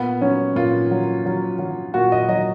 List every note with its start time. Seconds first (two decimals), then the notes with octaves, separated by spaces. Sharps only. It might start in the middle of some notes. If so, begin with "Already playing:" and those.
Already playing: A#2 B3
0.21 F#3 C#4
0.56 A#2 F4
0.91 F#3
1.26 F#3
1.59 F#3
1.94 A#2 F#4
2.12 D#5
2.28 F#3 D#5